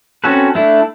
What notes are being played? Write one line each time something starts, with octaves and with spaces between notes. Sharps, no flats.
C4 C#4 F#4 A4 B4
A3 D4 E4